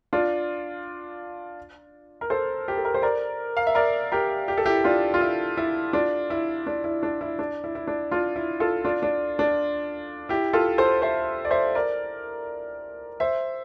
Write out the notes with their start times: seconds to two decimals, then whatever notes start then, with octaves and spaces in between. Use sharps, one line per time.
0.13 D4 F4
2.21 A#4
2.30 A4 C5
2.68 G4
2.77 A4
2.85 A#4
2.94 C5
3.02 A#4 D5
3.57 F5
3.67 E5
3.75 A#4 D5
4.12 G4 A#4
4.48 G4
4.58 A4
4.66 E4 G4
4.84 D4 F4
5.14 F4
5.21 E4
5.57 E4
5.93 D4 F4
6.30 E4
6.67 D4
6.84 E4
7.03 D4
7.21 E4
7.39 D4
7.64 E4
7.75 E4
7.87 D4
8.11 D4 F4
8.36 E4
8.60 F4 A4
8.84 D4 F4
9.03 D4
9.39 D4
10.29 E4 G4
10.53 F4 A4
10.78 A4 C5
11.02 C5 E5
11.45 D5
11.51 C5 E5
11.75 A#4 D5
13.20 C5 E5